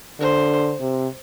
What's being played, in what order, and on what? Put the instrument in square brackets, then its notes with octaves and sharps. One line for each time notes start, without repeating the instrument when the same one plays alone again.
[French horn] D3 [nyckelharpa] C5
[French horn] C3